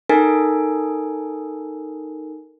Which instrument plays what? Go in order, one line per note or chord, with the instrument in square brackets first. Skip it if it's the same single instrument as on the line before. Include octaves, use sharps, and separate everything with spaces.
[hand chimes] D#4 A4 A#4 G#5